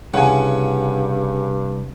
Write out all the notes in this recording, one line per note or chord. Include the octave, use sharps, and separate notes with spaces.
C2 G2 C#3 F#5 G#5